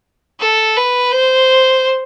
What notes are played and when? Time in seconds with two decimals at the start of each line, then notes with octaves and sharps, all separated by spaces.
0.40 A4
0.77 B4
1.12 C5